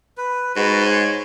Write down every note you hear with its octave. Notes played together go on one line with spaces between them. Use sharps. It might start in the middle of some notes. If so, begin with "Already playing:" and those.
B4
G#2 F#4 B4
C#5